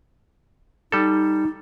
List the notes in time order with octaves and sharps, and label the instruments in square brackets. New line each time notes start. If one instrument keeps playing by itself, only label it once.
[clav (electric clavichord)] G3 A4 [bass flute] D#4